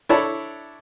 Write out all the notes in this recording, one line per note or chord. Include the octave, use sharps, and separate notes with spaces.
D4 E4 A4 C#5 A5 B5